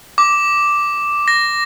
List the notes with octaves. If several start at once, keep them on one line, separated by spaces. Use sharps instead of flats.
D6
A#6